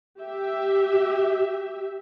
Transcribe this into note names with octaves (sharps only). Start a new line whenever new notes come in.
G4 E5